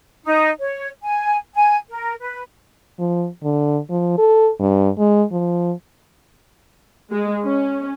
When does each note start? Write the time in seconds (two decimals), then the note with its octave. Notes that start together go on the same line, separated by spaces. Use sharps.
0.25 D#4
0.59 C#5
1.02 G#5
1.54 G#5
1.89 A#4
2.21 B4
2.99 F3
3.43 D3
3.89 F3
4.18 A4
4.60 G2
4.98 G#3
5.32 F3
7.12 G#3
7.43 C#4